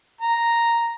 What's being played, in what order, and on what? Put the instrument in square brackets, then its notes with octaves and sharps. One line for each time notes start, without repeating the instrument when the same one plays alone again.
[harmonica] A#5